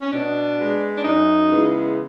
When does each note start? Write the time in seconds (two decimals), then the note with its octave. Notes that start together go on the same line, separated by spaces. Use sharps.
0.02 C#4
0.12 B2 D4
0.59 G#3 B3
0.97 D4
1.04 F#2 D#4
1.50 C#3 E3 G#3 B3